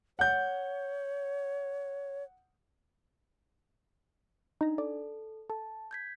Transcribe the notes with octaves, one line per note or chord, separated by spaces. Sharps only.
C#5 F#5 G6
D4 D#4 A#5
A4 D5
A4 A5
G6 G#6 B6